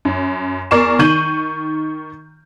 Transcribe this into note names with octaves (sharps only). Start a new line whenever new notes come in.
F#2
E2 A#4 D5 C#6 C7 E7
D#3 C#6 G6 D#7 F#7